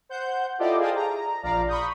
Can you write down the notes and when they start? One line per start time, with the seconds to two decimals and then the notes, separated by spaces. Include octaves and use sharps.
0.09 C5 F#5 G6
0.58 E4 F4 G4 A4 D5 D#5
0.79 G#4 C5 F5 G5 A5 D#6
0.95 A#5
1.43 A#1 F3 D5 F5 A#5
1.68 B5 C#6 D#6 G6